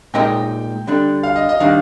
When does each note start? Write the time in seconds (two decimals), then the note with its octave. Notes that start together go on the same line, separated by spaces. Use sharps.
0.14 A#2 G#3 D#4 A#4 D#5 G5
0.87 D3 G3 D4
1.23 F5
1.36 D#5
1.49 D#5
1.60 D#3 G3 D4 F5